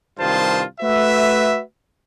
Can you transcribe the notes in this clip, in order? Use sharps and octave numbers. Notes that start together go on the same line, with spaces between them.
C2 G2 D#3 F4 C5 A5
A3 F#4 B4 E5